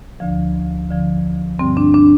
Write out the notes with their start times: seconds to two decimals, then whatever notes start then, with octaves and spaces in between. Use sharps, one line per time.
0.20 D2 D3 F3
0.89 D2 D3 F3
1.59 G2 D3 G3 C4
1.77 D4
1.94 D4